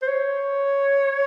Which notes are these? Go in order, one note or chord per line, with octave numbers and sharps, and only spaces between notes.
C5
C#5